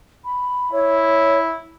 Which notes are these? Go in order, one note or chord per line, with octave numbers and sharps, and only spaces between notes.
B5
E4 C#5